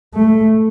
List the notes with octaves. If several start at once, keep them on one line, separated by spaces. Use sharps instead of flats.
A3